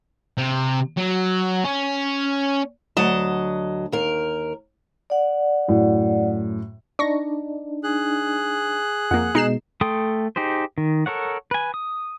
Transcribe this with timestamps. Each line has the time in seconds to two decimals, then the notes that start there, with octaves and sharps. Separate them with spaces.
0.38 C3
0.97 F#3
1.64 C#4
2.97 D2 F#3 D#5 A5
3.92 D#2 A#4
5.10 D5 F#5
5.68 F#2 A2
6.99 D4 D#4 C#6 A#6
7.84 G#4 F#6
9.11 F2 A#3 F#5
9.35 B2 G#3 D#4 C7 E7
9.81 A3 A4 G5 C6 D#6
10.36 D#4 G4 G#4 C5
10.78 D#3
11.06 A4 A#4 C#5 F#5
11.51 B4 G#5
11.74 D#6